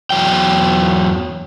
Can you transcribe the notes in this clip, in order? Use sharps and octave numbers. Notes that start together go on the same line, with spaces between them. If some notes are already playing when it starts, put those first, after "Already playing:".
E2 F#3 G5